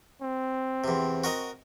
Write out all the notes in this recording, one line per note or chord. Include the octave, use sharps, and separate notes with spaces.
C4
E2 C3
F#4 A#4 D#5